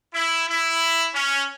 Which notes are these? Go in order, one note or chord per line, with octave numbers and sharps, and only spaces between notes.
E4
E4
C#4